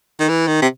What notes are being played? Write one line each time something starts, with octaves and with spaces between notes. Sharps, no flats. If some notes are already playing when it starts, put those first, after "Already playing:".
D#3
E3
D#3
C3